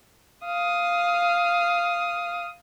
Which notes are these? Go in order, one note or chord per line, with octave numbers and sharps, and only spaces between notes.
F5 D#6